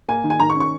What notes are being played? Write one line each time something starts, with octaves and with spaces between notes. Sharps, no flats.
A#3 G#5
D#3
G#5
D#3 A#5
C#6
C#4
C#6